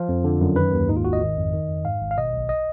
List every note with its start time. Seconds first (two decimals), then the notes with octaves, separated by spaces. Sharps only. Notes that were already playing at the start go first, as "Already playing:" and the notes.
Already playing: F3 F4
0.09 F2
0.24 D3
0.41 F#2
0.56 D#3 B4
0.73 D#2
0.89 G#2 D#4
0.97 F4
1.04 G#1 F#4
1.13 D#5
1.21 D#3
1.37 F2
1.53 D#3
1.68 F2
1.85 G#2 F5
2.01 G#1
2.11 F5
2.17 B2 D#5
2.33 B1
2.49 D#5